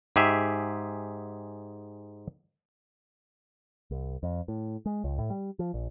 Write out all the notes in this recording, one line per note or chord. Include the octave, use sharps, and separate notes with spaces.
G#2 G4 G#4 E5
C2
F2
A2
G#3
C#2
A2
G3
F3
A#1